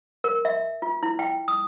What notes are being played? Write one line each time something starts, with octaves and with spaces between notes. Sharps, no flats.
A#4
E5
F4
E4
G5
D#6